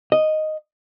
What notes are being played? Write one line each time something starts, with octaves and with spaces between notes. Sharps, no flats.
D#5